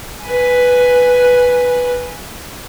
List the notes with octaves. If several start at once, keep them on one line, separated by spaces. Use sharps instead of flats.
B4 G#5